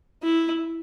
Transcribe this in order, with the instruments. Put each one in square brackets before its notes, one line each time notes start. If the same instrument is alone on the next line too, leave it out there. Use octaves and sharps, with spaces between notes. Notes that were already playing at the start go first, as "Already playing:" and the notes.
[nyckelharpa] E4